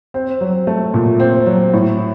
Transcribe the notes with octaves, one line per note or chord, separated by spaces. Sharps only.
C4
F#3
A3
A#2
C4
F#3
A2